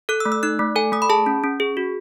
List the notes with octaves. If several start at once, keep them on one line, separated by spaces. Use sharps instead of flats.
A4 F#6
E6
A3
E6
D#4 F#6
A3
A4 G#5
A3 D#6
B5
G#4 A5
C#4
C#4
G#4
F#4